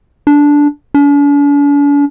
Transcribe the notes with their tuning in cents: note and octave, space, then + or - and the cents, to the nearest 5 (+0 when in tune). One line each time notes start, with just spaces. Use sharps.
D4 -10
D4 -45